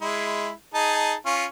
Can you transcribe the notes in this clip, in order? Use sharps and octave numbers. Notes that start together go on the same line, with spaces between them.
G#3 E4
D#4 G#4 A5
C#4 F4